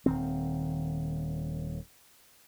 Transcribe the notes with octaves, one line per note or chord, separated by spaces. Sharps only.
D#1 D#3 C4